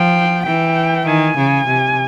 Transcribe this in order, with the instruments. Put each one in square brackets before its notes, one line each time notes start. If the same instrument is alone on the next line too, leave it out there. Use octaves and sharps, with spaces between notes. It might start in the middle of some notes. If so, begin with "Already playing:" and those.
Already playing: [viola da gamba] F3 [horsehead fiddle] G5
[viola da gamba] E3 [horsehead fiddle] G5
[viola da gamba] D#3 [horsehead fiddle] G#5
[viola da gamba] C#3
C3